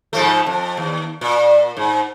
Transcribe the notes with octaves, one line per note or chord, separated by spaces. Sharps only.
G#2 F3 A3
F2
D#2
A#2
G#2